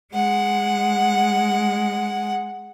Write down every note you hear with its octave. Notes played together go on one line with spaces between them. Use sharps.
G#3 F#5